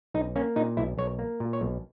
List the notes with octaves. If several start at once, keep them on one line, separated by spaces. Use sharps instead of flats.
B1 D#4
A#3 C#4
A#2 D#4
B1 E4
B1 C#5
A#3
A#2
C#5
B1